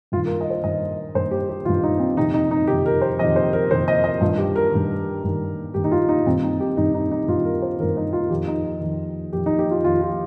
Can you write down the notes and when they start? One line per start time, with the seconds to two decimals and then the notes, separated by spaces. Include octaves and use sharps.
0.12 G2 F4
0.17 D#3
0.25 A#4
0.41 D#5
0.50 C5
0.64 G2 D#3 D#5
1.15 G2 D#3 C5
1.31 G4
1.49 G4
1.65 D#3 F4
1.68 G2
1.83 D#4
1.99 C4
2.16 F2 C3 D#3 D#4
2.34 D#4
2.51 D#4
2.67 F2 C3 D#3 G4
2.86 A#4
3.02 C5
3.19 F2 C3 D#3 D#5
3.36 C5
3.53 A#4
3.71 F2 C3 D#3 C5
3.88 D#5
4.04 D#5
4.21 G2 F4
4.24 D#3
4.38 G4
4.56 A#4
4.72 G2 D#3
5.24 G2 D#3
5.74 G2 D#3 G4
5.84 D#4
5.92 F4
6.09 D#4
6.26 G2 D#3 C4
6.43 D#4
6.60 G4
6.77 G2 D#3 D#4
6.94 D#4
7.11 D#4
7.28 G2 F4
7.33 D#3
7.45 A#4
7.62 C5
7.79 D#3 A#4
7.83 G2
7.97 D#4
8.13 F4
8.30 F2 D#3 G4
8.47 D#4
8.81 F2 D#3
9.33 F2 D#3 G4
9.46 D#4
9.59 G4
9.71 F4
9.84 F2 D#3 F4
10.01 F4